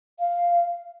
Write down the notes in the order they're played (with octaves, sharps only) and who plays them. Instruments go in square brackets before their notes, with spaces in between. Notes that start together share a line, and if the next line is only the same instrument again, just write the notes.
[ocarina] F5